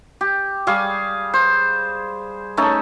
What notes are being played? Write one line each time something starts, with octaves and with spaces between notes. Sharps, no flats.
G4
G3 G#4 F5 C#6
C5
A3 C#4 D#4 A4